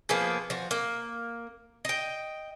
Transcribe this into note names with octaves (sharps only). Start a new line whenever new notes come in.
F3 A#3 B3 G#4
F3 F#4
A#3
D#5 G5